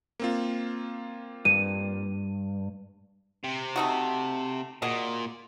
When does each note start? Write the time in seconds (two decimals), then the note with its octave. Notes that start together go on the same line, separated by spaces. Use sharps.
0.20 A#3 C4 F4
1.45 G2 D#7
3.44 C3
3.76 A3 D#4 F#4
4.82 A#2 F#4 G#4 D#5